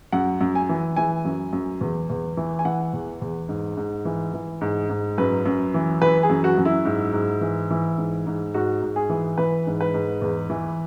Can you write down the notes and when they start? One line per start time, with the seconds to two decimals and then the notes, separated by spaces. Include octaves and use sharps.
0.12 F#2 F#5
0.41 F#2
0.55 G#5
0.69 E3
0.96 E3 G#5
1.25 F#2
1.53 F#2
1.81 E2
2.10 E2
2.37 E3
2.59 G#5
2.65 E3 F#5
2.93 E2
3.22 E2
3.49 G#2
3.77 G#2
4.05 E3
4.34 E3
4.61 G#2
4.90 G#2
5.18 F#2 B4
5.46 F#2
5.74 E3
6.01 E3 B4
6.23 G#4
6.30 F#2
6.44 F#4
6.58 F#2
6.65 E4
6.85 G#2
7.13 G#2
7.41 E3
7.70 E3
7.98 G#2
8.27 G#2
8.54 G#2 F#4
8.82 G#2
8.96 G#4
9.10 E3
9.38 E3 B4
9.67 G#2
9.81 B4
9.94 G#2
10.22 E2
10.50 E3